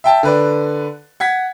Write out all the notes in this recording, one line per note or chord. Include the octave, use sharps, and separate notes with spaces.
E5 G5 A5
D3 B4 D5
F#5 G#6 B6